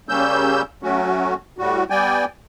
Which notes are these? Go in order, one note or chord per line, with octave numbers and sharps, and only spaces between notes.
C#3 G3 A#3 C#4 E6 G6
F#3 A3 C#4 F#4
A2 G3 F#4
G3 B3 D5 G5 G#5